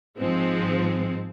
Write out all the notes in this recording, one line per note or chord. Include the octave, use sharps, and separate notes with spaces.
G#1 G#2 F3 G#3 C4